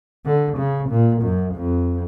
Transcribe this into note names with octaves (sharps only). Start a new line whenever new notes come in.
D3
C#3
A#2
F#2
F2